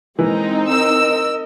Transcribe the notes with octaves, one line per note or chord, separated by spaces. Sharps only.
E3 G#3 A#3 C4 D#4 A#5
A#4 D#5 E6